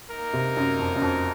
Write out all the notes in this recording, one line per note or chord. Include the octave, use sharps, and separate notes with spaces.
A#3 D#4 A#4
C3
F#2
F2
F#2
F2